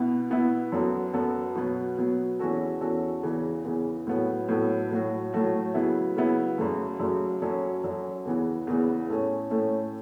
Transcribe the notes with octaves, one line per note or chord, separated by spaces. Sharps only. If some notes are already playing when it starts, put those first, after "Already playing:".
Already playing: B2 B3 E4
B2 B3 E4
F#2 F#3 B3 A4
F#2 F#3 B3 A4
B2 F#3 B3
B2 F#3 B3
E2 E3 C#4 F#4 A4
E2 E3 C#4 F#4 A4
E2 C#3 E3
E2 C#3 E3
A2 F#3 B3 A4
A2 F#3 B3 A4
A2 F#3 A3 F#4
A2 F#3 A3 F#4
C#3 F#3 B3 E4
C#3 F#3 B3 E4
F#2 C#3 F#3 A3
F#2 C#3 F#3 A3
F#2 F#3 C#4 A4
F#2 F#3 C#4 A4
E2 C#3 E3 B3
E2 C#3 E3 B3
A2 A3 C#4
A2 A3 C#4